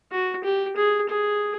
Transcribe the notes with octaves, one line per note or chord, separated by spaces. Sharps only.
F#4
G4
G#4
G#4